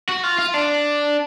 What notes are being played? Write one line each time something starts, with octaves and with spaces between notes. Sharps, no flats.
F#4
F4
F4
D4